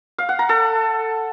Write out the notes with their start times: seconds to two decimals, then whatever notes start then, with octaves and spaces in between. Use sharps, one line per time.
0.18 F5
0.29 F#5
0.39 A#5
0.49 A4